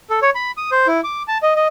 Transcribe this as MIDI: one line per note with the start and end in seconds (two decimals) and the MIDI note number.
0.10 0.19 69
0.22 0.30 73
0.35 0.52 83
0.57 0.70 87
0.72 0.87 72
0.87 1.01 64
1.04 1.23 86
1.28 1.38 81
1.43 1.53 75
1.56 1.68 75